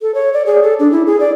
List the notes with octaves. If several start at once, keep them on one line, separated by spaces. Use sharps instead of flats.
A4
C#5
D5
G#4
A4
D4
E4
G#4
D5